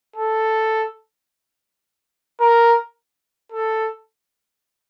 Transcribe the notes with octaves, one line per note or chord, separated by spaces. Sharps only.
A4
A#4
A4